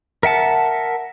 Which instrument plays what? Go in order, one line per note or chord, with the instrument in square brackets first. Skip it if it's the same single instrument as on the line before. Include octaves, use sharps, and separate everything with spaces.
[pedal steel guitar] A#4 E5 F#5 A5